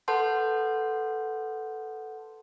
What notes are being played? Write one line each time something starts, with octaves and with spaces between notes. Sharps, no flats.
A4 B4 F#5 A5 C6 G6